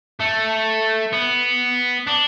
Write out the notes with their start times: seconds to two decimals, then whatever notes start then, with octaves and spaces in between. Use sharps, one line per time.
0.20 A3
1.13 B3
2.07 D4